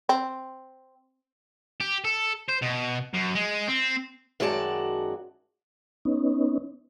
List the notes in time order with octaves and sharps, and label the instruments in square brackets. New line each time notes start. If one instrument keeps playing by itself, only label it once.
[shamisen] C4
[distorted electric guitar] G4
A4
C5
B2
F#2
G#3
C4
[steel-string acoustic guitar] F#2 D#3 G#3 F#4 D5 A5
[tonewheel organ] B3 C#4 D#4